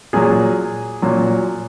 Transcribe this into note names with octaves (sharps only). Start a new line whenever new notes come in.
A#2 F#3 G#4 G#5
A#2 F#3